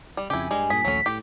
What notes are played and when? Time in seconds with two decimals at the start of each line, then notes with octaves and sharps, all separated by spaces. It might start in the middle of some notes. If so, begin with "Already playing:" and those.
0.17 G3
0.30 F2 C#3 E4 G4 G#5
0.51 G2 G3 G#3
0.70 G2 A#2 G#4 B6
0.85 A#1 D#2 F#3 A3 C#4
1.06 A2 G4